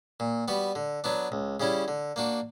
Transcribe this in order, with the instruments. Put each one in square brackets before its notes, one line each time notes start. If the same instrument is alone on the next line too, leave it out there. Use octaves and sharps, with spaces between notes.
[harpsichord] A#2
G3 B3 F#4
D3
F#3 B3 D4
C#2
C#3 G3 C#4 E4
D3
A#3 D4 F#4